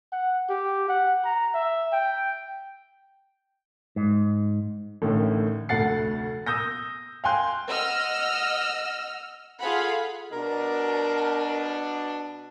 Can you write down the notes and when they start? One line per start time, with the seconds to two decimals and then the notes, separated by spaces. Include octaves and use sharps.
0.12 F#5
0.49 G4
0.89 F#5
1.25 A#5
1.54 E5
1.93 G5
3.96 G#2
5.02 A1 A2 D3 D#3
5.69 F1 D2 A3 F#5 A6 C7
6.46 D#6 E6 G6 A#6
7.24 F5 G5 G#5 C6 F#6 G6
7.69 D#5 F#5 E6 F6
9.60 F4 G#4 A4 F5 F#5 B5
10.33 B2 D4 A#4